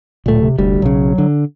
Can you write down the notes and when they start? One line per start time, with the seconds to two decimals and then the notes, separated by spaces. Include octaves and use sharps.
0.26 D1 A#2 A3
0.41 C3
0.58 F1 D2 G3
0.82 B1 C#3 F#3
1.18 D3